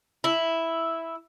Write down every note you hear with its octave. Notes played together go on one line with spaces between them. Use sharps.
E4